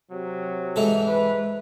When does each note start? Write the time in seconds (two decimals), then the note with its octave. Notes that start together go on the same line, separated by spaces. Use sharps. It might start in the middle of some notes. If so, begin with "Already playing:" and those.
0.12 C3 F#3
0.76 G#2 E3 A4
1.07 B4